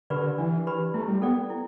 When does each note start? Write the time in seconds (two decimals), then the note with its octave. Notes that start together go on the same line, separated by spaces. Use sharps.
0.10 D3 G4 B4 D5 B5
0.38 E3 D4
0.67 G4 B4 D5 B5
0.94 A3 E4
1.08 G3
1.22 B3 A4 D5 G5
1.50 E4